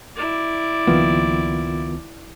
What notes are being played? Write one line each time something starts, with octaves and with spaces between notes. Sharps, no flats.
E4 D5
C#2 D#3 F3 A#3 B3 F4